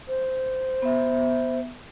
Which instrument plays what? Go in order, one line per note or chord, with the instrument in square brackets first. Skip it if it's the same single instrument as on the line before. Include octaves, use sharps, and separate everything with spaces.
[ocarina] C5
[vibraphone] B3 E5